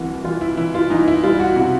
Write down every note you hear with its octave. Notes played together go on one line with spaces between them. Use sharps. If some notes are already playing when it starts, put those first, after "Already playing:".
Already playing: C2 E3 F#4
E3 F4
E4
E3 E4
F4
E3 D#4
E4
G3 F4
F#4
C3 F#4